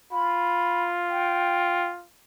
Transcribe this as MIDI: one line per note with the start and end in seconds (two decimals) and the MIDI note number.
0.12 2.05 65
0.12 0.82 83
1.09 1.84 79